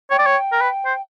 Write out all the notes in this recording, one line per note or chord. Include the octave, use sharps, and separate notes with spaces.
C#5 G5
D5
C#5
A#4
B4
C5